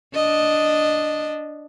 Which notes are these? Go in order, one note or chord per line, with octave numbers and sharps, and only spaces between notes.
D4 D#5